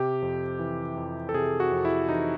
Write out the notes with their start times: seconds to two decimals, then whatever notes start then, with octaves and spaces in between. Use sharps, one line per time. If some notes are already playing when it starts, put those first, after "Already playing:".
Already playing: C3 G4
0.22 F2
0.59 E3
0.97 F2
1.29 A4
1.34 C3 G#4
1.60 F#4
1.72 F2
1.85 E4
2.09 E3 D#4